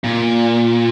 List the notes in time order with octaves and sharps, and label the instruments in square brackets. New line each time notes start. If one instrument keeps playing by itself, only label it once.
[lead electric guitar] A#2